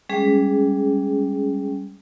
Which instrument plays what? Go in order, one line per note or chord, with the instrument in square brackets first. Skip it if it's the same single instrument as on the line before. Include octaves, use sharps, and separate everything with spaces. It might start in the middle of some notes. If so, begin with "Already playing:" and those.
[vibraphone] G3 G#3 C#4 G#4